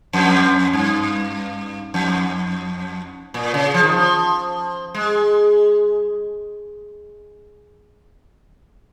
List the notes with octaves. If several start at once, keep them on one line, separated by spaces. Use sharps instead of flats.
F2
G2
F2
A#2
C#3
F3
D#3
F3
G#3